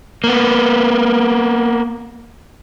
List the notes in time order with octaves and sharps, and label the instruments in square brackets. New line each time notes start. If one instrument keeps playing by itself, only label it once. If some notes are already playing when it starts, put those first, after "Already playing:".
[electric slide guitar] A#3 B3